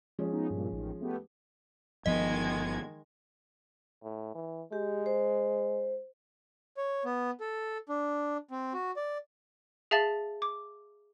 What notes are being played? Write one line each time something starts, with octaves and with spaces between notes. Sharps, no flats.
F3 G#3 C#4
B3 D#4
G2 A#2
A1 D#3
A3 B3 G4
G1 D#3 F3 G#3 B3 D#5 G#6
A2
E3
G#3 G4
C5
C#5
B3
A4
D4
C4
F#4
D5
G#4 E5 F5 A5 A6 F#7
D6